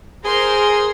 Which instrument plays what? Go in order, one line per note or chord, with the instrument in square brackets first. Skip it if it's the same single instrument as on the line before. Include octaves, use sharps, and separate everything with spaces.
[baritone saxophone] G#4 [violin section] A#4 C5 C6